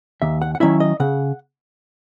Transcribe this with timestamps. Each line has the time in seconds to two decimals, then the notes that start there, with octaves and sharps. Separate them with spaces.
0.22 D#2 E5
0.42 F#5
0.55 F#5
0.60 D#3 F#3 C#4 E4 E5
0.80 D#5
1.00 C#3 F#5